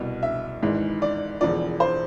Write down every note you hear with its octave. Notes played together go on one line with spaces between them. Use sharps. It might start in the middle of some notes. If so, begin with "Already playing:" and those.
Already playing: C2 B2
E5
G#1 G#2 E3
D5
E1 E2 D3 F3 D5
C5